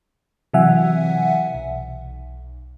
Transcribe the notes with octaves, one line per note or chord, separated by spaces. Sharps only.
C3 E3 F#3 E5 F#5 G#5
B1